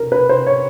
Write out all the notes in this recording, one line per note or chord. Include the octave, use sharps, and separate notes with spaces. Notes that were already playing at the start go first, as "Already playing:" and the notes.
Already playing: A#4
B4
C5
C#5